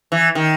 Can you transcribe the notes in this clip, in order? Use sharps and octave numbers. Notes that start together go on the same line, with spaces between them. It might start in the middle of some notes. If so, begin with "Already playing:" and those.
E3
D#3